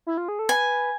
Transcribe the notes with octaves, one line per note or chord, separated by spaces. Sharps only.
E4
F4
G#4
A4
B4 G#5